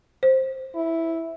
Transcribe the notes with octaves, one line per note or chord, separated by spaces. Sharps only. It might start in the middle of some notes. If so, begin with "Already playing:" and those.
C5
E4